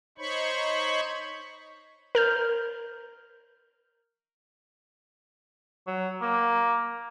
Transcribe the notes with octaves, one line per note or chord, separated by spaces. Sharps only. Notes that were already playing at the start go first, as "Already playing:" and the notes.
D#4 C5 C#5 B5 C#6
A#4 F6 G6
F#3
A#3